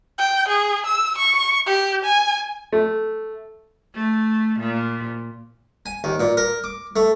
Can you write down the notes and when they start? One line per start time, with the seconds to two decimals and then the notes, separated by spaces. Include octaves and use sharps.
0.19 G5
0.48 G#4
0.86 E6
1.18 C#6
1.66 G4
2.04 G#5
2.73 A3
3.95 A3
4.60 A#2
5.86 G#5
6.04 D#2
6.20 A#2
6.37 A#4
6.64 D6
6.96 A3